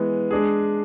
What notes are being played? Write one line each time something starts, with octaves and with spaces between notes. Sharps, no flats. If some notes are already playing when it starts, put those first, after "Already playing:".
Already playing: E3 G#3 B3
G#3 D4 G#4